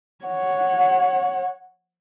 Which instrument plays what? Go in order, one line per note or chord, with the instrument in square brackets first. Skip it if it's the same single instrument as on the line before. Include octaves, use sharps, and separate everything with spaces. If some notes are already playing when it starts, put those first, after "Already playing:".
[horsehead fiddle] C#5 F#5